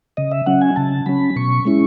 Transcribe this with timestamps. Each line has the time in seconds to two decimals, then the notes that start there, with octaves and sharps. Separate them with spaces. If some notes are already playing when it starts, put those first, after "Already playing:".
0.17 C#3 D#5
0.32 E5
0.46 F#3 C#4 F#5
0.61 G#5
0.76 C#3 A5
1.06 F#3 C#4 B5
1.36 B2 C#6
1.65 G#3 C#4 E4